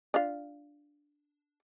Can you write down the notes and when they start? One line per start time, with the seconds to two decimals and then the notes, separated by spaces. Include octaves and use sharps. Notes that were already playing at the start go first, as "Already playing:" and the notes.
0.14 D4 F4 F5